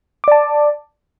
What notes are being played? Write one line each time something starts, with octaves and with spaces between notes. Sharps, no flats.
D5 A5 D6